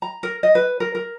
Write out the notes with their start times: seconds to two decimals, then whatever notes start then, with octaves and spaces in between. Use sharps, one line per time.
0.02 A#5
0.23 A#4
0.43 D#5
0.55 B4
0.80 A#4
0.95 A#4